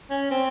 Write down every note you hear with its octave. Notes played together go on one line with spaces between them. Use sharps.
C#4
C4